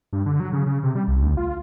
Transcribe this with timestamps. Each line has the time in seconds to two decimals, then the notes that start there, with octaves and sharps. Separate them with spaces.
0.13 G2
0.26 D3
0.40 F#3
0.53 C#3
0.66 C#3
0.83 C3
0.95 G3
1.08 C2
1.22 D2
1.37 F4